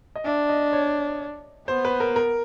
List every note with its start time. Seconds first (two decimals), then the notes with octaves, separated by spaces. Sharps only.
0.16 D#5
0.25 D4 E5
0.49 D#5
0.73 C#5
1.68 B3 C5
1.85 B4
2.00 A#4
2.16 A#4